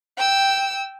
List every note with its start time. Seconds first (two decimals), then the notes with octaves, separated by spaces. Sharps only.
0.17 G5 E6